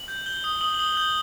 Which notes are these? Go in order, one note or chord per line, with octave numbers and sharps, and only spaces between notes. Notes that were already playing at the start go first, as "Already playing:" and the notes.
Already playing: F#7
G6
G6 G7
D#6
D#6 F#7
D#6 G7
F#7
G6